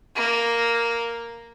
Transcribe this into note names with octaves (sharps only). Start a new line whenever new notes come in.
A#3